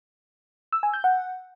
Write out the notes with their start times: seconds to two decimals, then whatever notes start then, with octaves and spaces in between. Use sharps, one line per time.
0.73 E6
0.83 G#5
0.93 G6
1.04 F#5